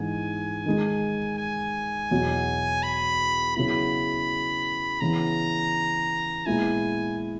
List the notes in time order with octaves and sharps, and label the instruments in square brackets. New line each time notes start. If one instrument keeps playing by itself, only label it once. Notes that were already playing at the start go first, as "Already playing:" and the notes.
Already playing: [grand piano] G#2 E3 B3 D#4 [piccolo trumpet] G#5
[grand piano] D#3 G#3 D#4
[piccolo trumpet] G#5
[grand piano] E2 B2 F#3
[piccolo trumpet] B5
[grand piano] C#3 F#3 B3 E4 [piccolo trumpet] B5
[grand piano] C#3 E3 B3 [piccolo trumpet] A#5
[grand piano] A#2 G#3 B3 E4 [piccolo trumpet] G#5